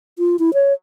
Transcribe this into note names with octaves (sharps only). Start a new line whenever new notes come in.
F4
E4
C#5